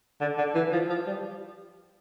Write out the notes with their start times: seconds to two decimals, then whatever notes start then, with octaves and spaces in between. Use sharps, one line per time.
0.21 D3
0.38 D3
0.55 E3
0.73 F3
0.90 F3
1.07 G3